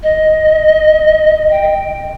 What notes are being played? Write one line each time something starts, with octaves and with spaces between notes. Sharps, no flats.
D#5
G5